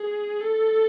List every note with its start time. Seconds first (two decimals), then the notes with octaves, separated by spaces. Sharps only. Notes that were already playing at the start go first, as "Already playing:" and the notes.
Already playing: G#4
0.41 A4